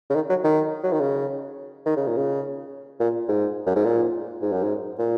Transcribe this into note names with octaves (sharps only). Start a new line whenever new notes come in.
C#3
D#3
F#3
D#3
F#3
D#3
C#3
D#3
C#3
A#2
C#3
A#2
G#2
F#2
G#2
A#2
G#2
F#2
G#2
A#2